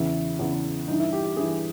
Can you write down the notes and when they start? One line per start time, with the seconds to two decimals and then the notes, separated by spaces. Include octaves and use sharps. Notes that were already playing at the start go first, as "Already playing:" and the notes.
Already playing: E2 C#3 E3 E4
0.39 E2 C#3 E3
0.88 G2 E3 D#4
1.00 E4
1.13 G4
1.24 G4
1.37 G2 E3 G#4